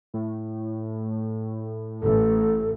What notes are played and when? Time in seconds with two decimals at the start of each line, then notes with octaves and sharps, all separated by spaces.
0.14 A2
2.02 A1 A4